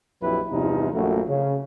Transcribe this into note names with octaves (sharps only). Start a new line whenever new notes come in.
A#1 F2 F#3 E4 G4 B4
E2 G2 C3 E3 F3 D#4
A#1 F#2 A3 F#4
C#3